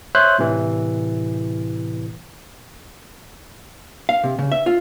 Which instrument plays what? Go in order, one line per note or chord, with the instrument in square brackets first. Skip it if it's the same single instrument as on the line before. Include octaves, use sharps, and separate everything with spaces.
[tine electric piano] C5 C#5 E5 C6 F#6 G6
A2 C3 E3
[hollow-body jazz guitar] F5
C3
C#3
E5
F4